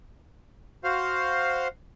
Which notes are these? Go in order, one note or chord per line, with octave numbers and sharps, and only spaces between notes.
F#4 C5 F5